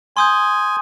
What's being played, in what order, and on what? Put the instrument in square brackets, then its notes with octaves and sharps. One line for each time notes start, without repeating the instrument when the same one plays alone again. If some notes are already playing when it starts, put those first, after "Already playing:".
[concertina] G#5 [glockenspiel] C6 D#6 G6